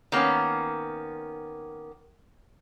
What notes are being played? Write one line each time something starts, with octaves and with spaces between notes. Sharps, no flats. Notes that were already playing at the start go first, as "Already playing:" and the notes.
D#3 A#3 B3 C#4